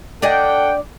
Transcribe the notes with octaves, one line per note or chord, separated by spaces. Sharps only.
D4 A4 D5 D#5 F#5 G5